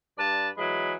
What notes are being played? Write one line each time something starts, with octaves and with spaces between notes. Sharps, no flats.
G2 B4 D5 A5
E3 F#3 G#3 B5